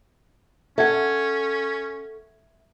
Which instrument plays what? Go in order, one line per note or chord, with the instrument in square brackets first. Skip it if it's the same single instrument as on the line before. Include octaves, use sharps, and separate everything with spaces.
[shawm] C#4 [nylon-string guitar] A4 F#5 [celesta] E5 G#6